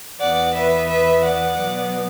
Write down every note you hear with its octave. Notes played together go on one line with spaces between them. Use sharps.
E2 E3 B3 D5 F#5
B4 E5
B4 E5
D5 F#5
B2 F#3 B3